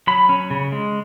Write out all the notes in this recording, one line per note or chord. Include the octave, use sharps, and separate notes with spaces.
F#3 B5
C#4
C#3
G#3